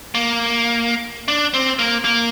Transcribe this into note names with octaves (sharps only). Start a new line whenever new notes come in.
A#3
D4
C4
A#3
A#3